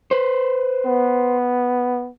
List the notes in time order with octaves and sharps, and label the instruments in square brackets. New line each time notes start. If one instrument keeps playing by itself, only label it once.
[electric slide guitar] B4 C5
[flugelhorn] B3